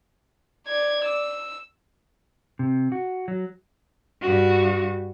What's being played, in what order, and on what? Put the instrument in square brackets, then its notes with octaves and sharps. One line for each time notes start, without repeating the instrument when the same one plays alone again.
[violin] D5 G#6
E6
[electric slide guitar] C3
F#4
F#3
[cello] G2 F#4